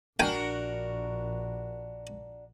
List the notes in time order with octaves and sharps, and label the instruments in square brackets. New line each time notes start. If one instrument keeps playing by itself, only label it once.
[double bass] A#1 [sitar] D4 F#4 A#4 [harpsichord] G5 G#5